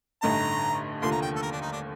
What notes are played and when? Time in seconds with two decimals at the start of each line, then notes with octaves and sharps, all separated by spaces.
0.22 A1 G2 D3 A3 D#4 A#5
1.02 F1 D#2 D3 F3 A3 C6
1.12 A#5
1.22 G5
1.36 A4
1.42 A#4
1.52 D4
1.61 D#4
1.72 D4